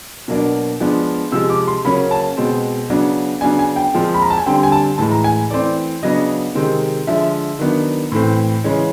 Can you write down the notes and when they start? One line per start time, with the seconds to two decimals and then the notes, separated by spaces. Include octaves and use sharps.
0.28 B2 F#3 A#3 D4
0.80 F3 G#3 B3 D4
1.32 C3 F3 G#3 E6
1.50 D6
1.68 C6
1.85 C#3 F#3 A#3 C#4 B5
2.11 A5
2.37 B2 G#3 C4
2.90 C#3 F#3 B3 D4
3.41 C#3 F#3 B3 D4 G#5
3.59 G#5
3.76 G5
3.94 A#2 F3 G#3 C4
4.14 B5
4.22 A#5
4.30 A5
4.38 G#5
4.46 D3 G3 C4 G5
4.63 G#5
4.72 A5
4.98 A2 E3 G#3 A5
5.11 A#5
5.24 G#5
5.51 E3 A3 C4 D5
6.03 C#3 F#3 B3 D4 D#5
6.55 C3 D#3 G#3 C4
7.07 D3 F3 G#3 E5
7.59 D#3 F#3 B3 D4
8.12 A2 E3 A3 C4
8.64 C#3 E3 G#3 C#4